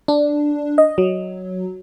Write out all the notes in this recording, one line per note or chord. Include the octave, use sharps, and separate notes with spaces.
D4
D#5
F#3